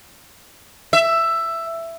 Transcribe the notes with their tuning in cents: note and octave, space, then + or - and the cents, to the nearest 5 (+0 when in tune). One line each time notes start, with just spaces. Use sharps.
E5 +10